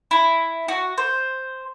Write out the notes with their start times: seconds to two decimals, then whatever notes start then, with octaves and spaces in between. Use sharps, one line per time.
0.11 E4
0.68 F#4
0.98 C5